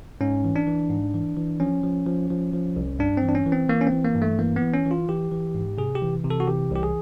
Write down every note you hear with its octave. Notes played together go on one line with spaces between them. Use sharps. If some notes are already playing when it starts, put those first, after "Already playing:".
G#2 C#4
E3
D4
E3
G#2
E3
E3
F3 C#4
F3
F3
F3
F3
C2
G2 D4
C4
E3
D4
C#4
E3
C4
E3 A#3
C#4
C4
E3
A#3
G2
A3
E3 A#3
B3
E3
C#4
E3
F4
E3 G4
E3
G#2
C3 G#4
G4
E3
C3
A4
F#4
E3 G4
C2 G4
G#4